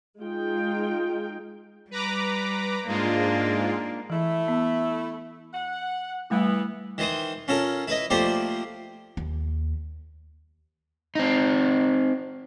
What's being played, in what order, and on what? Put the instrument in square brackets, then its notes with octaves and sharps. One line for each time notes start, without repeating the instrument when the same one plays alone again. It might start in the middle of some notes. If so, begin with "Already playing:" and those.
[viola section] G#3 D#4 F4 G5
[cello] G3 [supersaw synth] B4 A#5 D6
[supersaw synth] G#2 G#3 F4 [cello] A#3 D4
[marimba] E3 [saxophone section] A3 E4
[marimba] B3
[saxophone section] F#5
[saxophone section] E3 B3 [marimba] G3 A3 E4
[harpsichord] D#3 E3 C5 D#6
C#4 F4 A4 A#4
E4 B4 D#5
F3 A3 A#3 G4 C5 D5
[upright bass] D#2
[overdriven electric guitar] C4 D#4